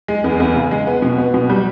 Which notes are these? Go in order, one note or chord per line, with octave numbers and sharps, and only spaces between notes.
G#3
E2
E2
C#3
G#3
B3
B2
B3
B2
G3